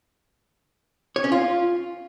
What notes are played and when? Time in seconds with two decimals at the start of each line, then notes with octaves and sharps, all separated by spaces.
1.16 C#5
1.24 C#4
1.32 F4